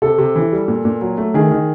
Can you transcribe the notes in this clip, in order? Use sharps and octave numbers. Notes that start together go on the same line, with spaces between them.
C3 A4
C3
E3
G3
A#2
A#2
F#3
A3
D#3 G#4
D#3